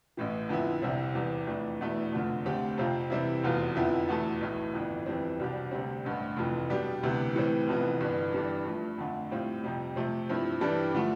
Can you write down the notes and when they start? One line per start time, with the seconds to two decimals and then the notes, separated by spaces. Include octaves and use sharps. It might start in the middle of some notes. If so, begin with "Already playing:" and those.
0.17 A1 A2 E3
0.49 F2 D3 F3 B3 E4
0.82 C2 C3 G3 C4 E4
1.14 E2 C3 E3 G3
1.47 F2 E3 A3 D4
1.81 E1 E2 B2 A3 E4
2.12 F1 E2 D3 F3 A3
2.45 D2 D3 A3 C4 G4
2.78 F2 C3 F3 C4 F4
3.10 C3 E3 G3 C4 E4
3.44 F1 E2 B2 B3 F4
3.75 F2 D3 F3 B3 E4
4.08 E2 B2 A3 E4 A4
4.41 B1 A2 E3
4.74 G1 F2 E3 B3
5.06 F2 E3 G3 C4
5.40 C2 B2 G3 D4 G4
5.71 D2 C3 G3 C4
6.05 A1 G2 D3 A3
6.37 F1 F2 E3
6.69 B2 G3 B3 D4 G4
7.03 D2 C3 E3 B3
7.35 A2 E3 G3 C4
7.68 F1 F2 E3 B3
8.00 G1 G2 E3 B3
8.33 G2 E3 G3 D4 A4
8.66 G2 F3 A3
8.98 F2 D3 A3
9.31 A2 G3 C4 F4
9.64 F2 C3 G3
9.96 C3 F3 A3 C4
10.29 G2 F3 C4 E4
10.61 G2 E3 G3 D4 A4
10.95 D3 F3 A3